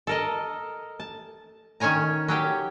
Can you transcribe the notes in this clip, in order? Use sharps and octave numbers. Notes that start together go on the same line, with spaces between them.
A4 A#4 D#5
A5
D#3 C#4 C#5 G#5 A#5
F#3 C#4 G4